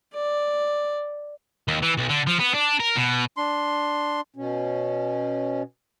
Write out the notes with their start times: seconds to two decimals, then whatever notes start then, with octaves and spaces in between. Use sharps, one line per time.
0.14 D5
1.68 D#2
1.82 E3
1.98 B1
2.09 D3
2.27 F3
2.39 B3
2.54 D4
2.80 A#4
2.96 B2
3.37 D4 C6
4.36 B2 C#4